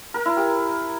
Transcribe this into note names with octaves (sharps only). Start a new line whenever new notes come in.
A#4
E4
G4